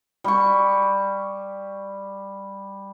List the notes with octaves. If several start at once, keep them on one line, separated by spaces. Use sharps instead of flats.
G3 C#6